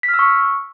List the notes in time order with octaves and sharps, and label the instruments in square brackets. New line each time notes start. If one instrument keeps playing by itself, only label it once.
[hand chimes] B6
F6
E6
C#6